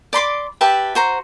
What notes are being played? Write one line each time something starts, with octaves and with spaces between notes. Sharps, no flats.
D5 B5 C6 D6
G4 B4 E5 A5
F#4 C5 A#5